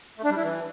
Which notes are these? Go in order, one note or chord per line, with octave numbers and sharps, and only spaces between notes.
A3
D4
G3
E4
E3